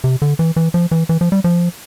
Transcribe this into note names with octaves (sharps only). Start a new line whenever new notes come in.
C3
D3
E3
E3
F3
E3
E3
F3
G3
F3